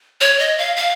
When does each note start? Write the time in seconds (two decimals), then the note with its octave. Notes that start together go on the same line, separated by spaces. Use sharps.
0.21 C#5
0.39 D#5
0.58 F5
0.76 F5